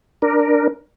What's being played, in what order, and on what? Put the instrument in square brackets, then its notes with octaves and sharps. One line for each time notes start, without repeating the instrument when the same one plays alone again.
[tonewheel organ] D4 A#4